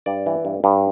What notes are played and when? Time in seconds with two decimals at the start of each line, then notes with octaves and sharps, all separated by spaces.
0.06 G2 D5
0.26 E3
0.45 G2
0.64 G2